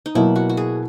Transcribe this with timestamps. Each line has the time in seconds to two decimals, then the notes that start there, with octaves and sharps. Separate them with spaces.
0.06 D#4
0.15 B2 F#3 A#3 E4
0.36 F#4
0.49 F#4
0.57 G#4